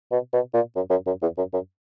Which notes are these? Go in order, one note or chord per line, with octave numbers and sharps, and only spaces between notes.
B2
B2
A#2
F#2
F#2
F#2
E2
F#2
F#2